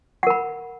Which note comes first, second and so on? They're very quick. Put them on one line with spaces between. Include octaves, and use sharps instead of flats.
F#5 A#4 B5